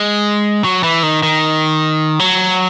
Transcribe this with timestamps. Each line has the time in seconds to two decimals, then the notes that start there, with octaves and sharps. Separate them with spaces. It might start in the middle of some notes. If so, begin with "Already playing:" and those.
Already playing: G#3
0.65 F#3
0.84 E3
1.03 D#3
1.23 D#3
2.19 F#3